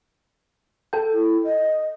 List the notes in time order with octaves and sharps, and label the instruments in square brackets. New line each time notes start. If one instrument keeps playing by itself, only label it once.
[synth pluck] A4 G5
[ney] E4
D#5